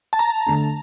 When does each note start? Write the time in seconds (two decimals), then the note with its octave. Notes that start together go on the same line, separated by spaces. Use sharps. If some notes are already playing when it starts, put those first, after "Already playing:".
0.13 A5
0.19 A#5
0.46 D3 A3 D4